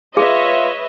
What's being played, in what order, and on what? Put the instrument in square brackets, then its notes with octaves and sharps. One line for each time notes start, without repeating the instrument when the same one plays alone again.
[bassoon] F4 [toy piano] G#4 [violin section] B4 D#5 [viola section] C#5 E5